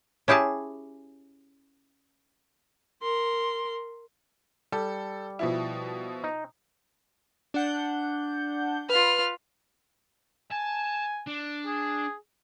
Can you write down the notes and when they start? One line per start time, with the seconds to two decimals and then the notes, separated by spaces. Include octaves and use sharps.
0.28 C#4 E4 G4 G#4 A5
3.02 A#4 C6
4.72 G3 A4
5.39 B2 F3 E4
6.24 D#4
7.54 D4 F#5 G6
8.89 F4 B4 F6
10.51 G#5 A5
11.27 D4
11.66 G#4